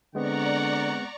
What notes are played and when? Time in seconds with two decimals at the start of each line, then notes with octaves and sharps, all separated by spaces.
0.15 D3 G#3 B3 C4 D5 F#5 A#5 C#6